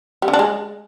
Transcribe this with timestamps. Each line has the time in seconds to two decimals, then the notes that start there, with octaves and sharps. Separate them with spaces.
0.22 G3
0.28 D3
0.34 D4
0.39 G#3